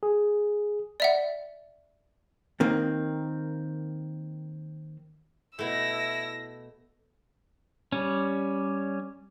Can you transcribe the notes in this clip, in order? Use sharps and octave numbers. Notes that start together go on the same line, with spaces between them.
G#4
D5 E5 F#5
D#3 A#3 C4
B2 A3 E4 E6 A#6
G3 C#4